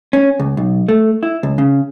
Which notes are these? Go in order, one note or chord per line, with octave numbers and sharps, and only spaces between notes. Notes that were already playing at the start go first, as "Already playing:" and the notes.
C#4
C#2
B1
A3
E4
C#2
C#3